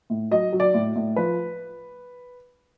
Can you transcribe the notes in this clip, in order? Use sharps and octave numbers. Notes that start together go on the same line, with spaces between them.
A2
F#3 D#5
F#3
D5
A2
A2
F3 B4